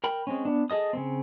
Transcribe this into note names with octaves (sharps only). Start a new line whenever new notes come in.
A#4 G5 B5
G#3 C4 C#4
B3 D4
G#4 A4 D#5 D#6
C#3 A3 C4